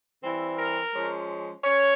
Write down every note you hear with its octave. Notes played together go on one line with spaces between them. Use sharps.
E3 G3 C4
A#4
F3 G#3 C#4
C#4 C#5